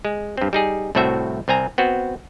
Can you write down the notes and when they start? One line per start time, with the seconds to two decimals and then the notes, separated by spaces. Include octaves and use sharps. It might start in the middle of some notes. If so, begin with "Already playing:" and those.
0.05 G#3
0.37 G2 C4
0.53 G3 D#4 G#4
0.95 C2 A2 A3 C4 F#4 E5
1.48 C2 C4 G#5 A#5
1.78 B3 C4 F#4